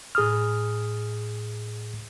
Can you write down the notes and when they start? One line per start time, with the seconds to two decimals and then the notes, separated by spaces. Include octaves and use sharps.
0.15 A2 G#4 D#6 F6